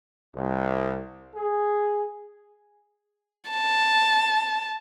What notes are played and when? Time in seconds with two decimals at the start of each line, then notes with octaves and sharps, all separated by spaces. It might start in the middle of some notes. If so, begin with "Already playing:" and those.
0.36 C2
1.35 G#4
3.50 A5